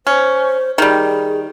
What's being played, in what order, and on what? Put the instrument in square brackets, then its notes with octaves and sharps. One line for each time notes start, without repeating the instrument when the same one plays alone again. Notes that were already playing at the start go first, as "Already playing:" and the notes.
[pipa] C#4 [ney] C5
[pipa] D#3 G3 [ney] G#4